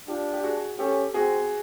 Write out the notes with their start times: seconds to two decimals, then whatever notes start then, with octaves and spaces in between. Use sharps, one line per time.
0.08 D4 F4 G4
0.33 G4
0.43 F#4 G#4
0.79 C#4 G4 A4
1.14 C4 F#4 G#4